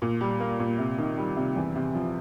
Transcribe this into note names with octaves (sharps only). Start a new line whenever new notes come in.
A#2
G3
A#3
A#2
C3
D#3
G3
C3
E2
C3
F3